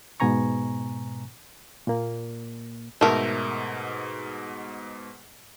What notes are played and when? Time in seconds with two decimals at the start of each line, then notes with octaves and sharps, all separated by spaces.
0.20 G#2 B2 B3 G#5 A#5 C#6
1.87 A#2 A#3
3.01 G#2 B2 A3 A#4